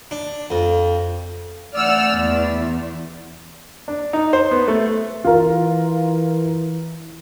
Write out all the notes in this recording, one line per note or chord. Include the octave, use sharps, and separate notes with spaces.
D4
F2
E3 A3 D5 F#5 E6 F6
E2
D4
D#4
C5
B3
A3
E3 F4 A#4